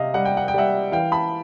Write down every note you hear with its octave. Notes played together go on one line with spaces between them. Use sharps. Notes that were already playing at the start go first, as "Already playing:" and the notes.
Already playing: C3 D#5 F5
G3 F#5
G5
F#5
G5
G3 E5 F#5
E3 F5 G5
A5 B5